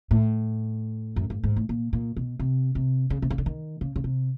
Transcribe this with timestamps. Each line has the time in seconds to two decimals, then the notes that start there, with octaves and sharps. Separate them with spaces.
0.11 A2
1.16 F#2
1.30 G2
1.43 G#2
1.56 A2
1.69 A#2
1.93 A#2
2.16 B2
2.39 C3
2.75 C3
3.10 C#3
3.22 C3
3.30 C#3
3.38 D3
3.46 D#3
3.81 C#3
3.96 C#3
4.04 C3